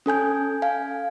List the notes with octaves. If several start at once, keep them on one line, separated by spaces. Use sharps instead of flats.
C#4 A4 G#5 G6
F5 G#5